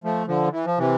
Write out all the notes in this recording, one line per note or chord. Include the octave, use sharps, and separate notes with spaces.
F3 A3
D3 F3
E3
F3
C3 E3